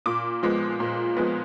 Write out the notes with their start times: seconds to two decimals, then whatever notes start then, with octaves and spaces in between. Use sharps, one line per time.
0.06 A#2 D6
0.43 F3 G#3 B3
0.80 A#2
1.17 F3 G#3 B3